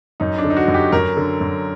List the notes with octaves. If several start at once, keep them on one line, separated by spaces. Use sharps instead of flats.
F#2 D#4
D4
D3
D#4
F#4
F#2
G4
F#2 A#4
D3
F#2